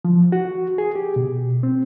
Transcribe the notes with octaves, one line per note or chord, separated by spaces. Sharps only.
F3
F#4
G#4
G4
B2
C4